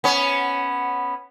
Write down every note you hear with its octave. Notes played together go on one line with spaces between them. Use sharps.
B3 C#4